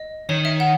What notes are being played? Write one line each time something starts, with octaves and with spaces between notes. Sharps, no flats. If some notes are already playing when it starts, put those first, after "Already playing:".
Already playing: D#5
D#3 C#5
E5
F#5